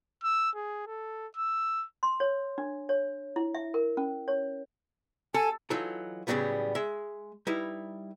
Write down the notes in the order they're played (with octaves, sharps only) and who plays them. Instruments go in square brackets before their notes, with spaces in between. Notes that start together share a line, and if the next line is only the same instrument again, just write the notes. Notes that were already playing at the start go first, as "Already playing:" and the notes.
[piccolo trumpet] E6
G#4
A4
E6
[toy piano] C6
C#5
D4
C#5
E4
E5
A#4
C#4
C#5
[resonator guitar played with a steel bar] A4 [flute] G#5
[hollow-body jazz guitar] E3 F#3 D#4 F4 A4
A2 C#3 E3 F#3 G3 B3
G#3 E5
G3 D#4 E4 B4